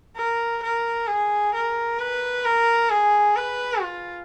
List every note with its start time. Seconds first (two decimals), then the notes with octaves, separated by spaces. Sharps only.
0.16 A#4
0.62 A#4
1.07 G#4
1.54 A#4
1.99 B4
2.44 A#4
2.90 G#4
3.36 B4
3.81 F4